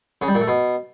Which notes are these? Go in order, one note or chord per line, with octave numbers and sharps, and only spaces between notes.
C#3
G3
A#2
A3
B2